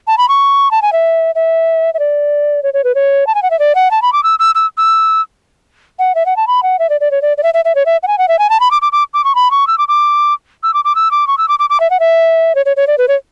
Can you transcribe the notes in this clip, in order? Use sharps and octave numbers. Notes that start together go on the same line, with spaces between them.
A5
B5
C#6
A5
G#5
E5
E5
E5
D5
C#5
C#5
B4
C#5
A5
G#5
F#5
E5
D5
F#5
A5
B5
D6
E6
E6
E6
E6
F#5
E5
F#5
A5
B5
F#5
E5
D5
D5
C#5
D5
D5
E5
E5
E5
C#5
E5
F#5
G#5
F#5
E5
G#5
A5
B5
D6
D6
D6
D6
C#6
B5
C#6
E6
D6
D6
E6
D6
D6
E6
D6
C#6
E6
D6
D6
D6
E5
F#5
E5
C#5
C#5
C#5
D5
B4
C#5